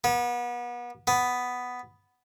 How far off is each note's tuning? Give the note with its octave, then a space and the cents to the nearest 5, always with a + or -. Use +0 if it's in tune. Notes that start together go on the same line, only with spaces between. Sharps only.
B3 -35
B3 +5